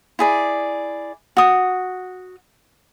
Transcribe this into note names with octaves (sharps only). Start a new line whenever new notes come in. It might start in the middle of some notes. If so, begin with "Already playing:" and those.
E4 G#4 D5
F#4 D#6